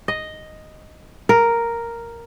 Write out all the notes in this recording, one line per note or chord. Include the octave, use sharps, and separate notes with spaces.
D#5
A#4